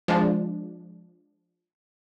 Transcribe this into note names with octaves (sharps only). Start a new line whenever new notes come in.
F3 G#3 D4